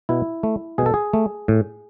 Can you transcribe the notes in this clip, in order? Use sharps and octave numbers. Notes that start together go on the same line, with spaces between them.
B2 E4
A3
B2 G#4
A4
G#4
A3
A2